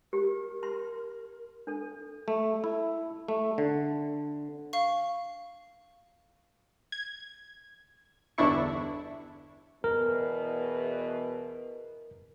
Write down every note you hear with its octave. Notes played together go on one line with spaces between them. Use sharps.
G4 A#4
C6
D4 A4
A3
E4
A3
D3
F5 C#6
G#6
G1 E2 D3 D4 E4 C#6
E2 B2 A#4 B4